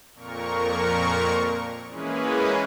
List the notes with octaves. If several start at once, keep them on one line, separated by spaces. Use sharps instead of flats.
F2 A#2 A#4 C#6
E3 G#3 A#3 C#4 G#4 B4